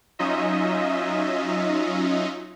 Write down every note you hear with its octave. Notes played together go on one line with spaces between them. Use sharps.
F#3 C#4 D#4 F4 D#5 E5